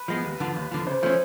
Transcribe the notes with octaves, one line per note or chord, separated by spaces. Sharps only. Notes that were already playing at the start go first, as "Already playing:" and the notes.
Already playing: B4
F3 G#3 B3
D#2
D3 F3
D#2
D3 F3
C#3 C5
F3 A3 C#4 C5